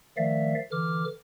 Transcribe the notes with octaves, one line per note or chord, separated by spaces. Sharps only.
D#3 F3 A3 D5 E5 F5
D3 E3 D6 F6